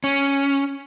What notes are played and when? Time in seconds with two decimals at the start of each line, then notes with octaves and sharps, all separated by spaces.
0.04 C#4